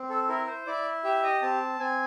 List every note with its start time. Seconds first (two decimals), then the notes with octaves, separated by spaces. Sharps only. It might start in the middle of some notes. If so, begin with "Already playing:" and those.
Already playing: C4
0.10 A4
0.29 E4 A#4
0.48 C5
0.66 E4 D5
1.04 G4 E5
1.23 D#5
1.42 C4 A5
1.80 C4 G#5